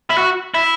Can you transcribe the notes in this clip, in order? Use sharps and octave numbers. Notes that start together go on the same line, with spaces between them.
E4
F#4
E4